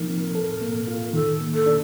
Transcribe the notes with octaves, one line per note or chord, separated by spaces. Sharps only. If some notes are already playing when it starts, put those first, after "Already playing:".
Already playing: F3 A#3 D#4 A#4
C4
A4
A#3
F4
D#3 A4
A#3
A4
D4